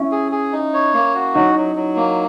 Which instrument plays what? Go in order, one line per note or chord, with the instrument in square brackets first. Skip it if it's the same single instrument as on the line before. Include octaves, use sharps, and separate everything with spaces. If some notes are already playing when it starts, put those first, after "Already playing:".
Already playing: [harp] C#4 E4
[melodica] G#4
G#4
D#4
C#5
A#3
F#4
[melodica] F#3 [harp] D#4
[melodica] F#3
F#3
A#3